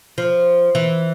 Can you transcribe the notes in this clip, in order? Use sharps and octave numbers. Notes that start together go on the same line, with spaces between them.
F3
E3